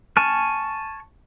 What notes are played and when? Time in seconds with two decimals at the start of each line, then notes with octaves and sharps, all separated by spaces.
0.17 G#5 A5 C#6 F6